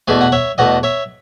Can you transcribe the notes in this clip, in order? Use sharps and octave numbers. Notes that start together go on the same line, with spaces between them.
E2 B2 A3 G#4 B4
F#5
C#5 E5
E2 B2 A3 D#5 F#5
C#5 E5